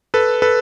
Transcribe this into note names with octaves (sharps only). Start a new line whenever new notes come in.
A4 B4
A4 B4